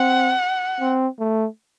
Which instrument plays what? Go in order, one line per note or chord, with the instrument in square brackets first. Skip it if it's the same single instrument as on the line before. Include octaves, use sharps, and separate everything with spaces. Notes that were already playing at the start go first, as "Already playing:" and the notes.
Already playing: [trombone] C4 [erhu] F#5
[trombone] C4
A3